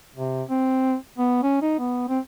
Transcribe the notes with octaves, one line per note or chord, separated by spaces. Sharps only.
C3
C4
B3
C#4
D#4
B3
C4